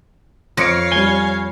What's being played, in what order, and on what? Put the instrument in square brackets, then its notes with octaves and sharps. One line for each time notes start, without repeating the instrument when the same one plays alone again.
[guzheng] F2 [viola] C#5 F5 [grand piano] A#6 C#7 D7
[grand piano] G3 G7 [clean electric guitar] G#5